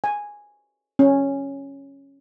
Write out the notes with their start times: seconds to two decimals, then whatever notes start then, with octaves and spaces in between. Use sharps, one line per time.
0.04 G#5
0.99 C#4